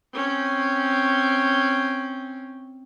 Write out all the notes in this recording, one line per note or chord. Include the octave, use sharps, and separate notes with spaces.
C4 C#4